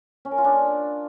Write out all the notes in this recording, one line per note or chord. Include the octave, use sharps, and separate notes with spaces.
C#4
A#4
F4
D4